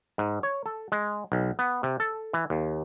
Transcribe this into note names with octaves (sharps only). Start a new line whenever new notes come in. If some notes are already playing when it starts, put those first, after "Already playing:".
G#2
C#5
A4
G#3
B1
B3
C3
A4
E3
D#2